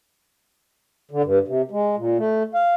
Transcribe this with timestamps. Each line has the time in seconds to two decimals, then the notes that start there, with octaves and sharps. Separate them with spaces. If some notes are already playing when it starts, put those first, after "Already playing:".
1.11 D3
1.24 G2
1.48 C3
1.71 G#3
1.97 A#2
2.18 A3
2.54 F5